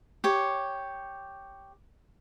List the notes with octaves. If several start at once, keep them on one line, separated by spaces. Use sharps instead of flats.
G4 C#5